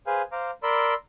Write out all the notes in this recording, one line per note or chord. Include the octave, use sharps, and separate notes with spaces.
G#4 B4 C5 F5 G#5
C5 F5 A#5 D6
A#4 D5 B5 C6 E6